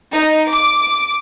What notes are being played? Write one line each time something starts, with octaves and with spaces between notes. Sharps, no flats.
D#4
D6